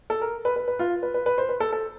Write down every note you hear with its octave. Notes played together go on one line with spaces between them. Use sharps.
A4
A#4
B4
B4
B4
F4
B4
B4
B4
C5
B4
A4
A4